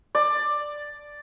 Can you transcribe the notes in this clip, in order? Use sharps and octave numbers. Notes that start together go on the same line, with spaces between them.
D5